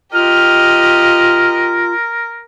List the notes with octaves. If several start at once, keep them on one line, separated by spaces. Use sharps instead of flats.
F4 G4 A#4 D#5 F6